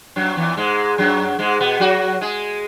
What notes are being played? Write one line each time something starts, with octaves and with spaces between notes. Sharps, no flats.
F#2 F#3
E2 E3
G#2 G#3
F#2 F#3
G#2 G#3
B2 B3
F#3 F#4
G#3 G#4